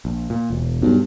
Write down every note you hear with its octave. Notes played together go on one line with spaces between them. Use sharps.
A#1
A#2
E1
B1 G2